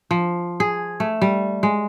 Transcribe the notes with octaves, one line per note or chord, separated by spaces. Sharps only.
F3
G#4
A3
G3
G#3